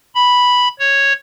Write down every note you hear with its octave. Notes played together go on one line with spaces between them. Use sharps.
B5
C#5